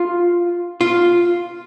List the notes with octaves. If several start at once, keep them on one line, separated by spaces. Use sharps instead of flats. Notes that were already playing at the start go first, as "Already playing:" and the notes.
Already playing: F4
F4